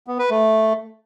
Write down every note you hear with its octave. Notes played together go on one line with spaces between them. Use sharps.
B3
B4
A3